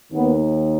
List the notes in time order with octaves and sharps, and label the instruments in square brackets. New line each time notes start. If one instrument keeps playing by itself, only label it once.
[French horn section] D#2 D#3 B3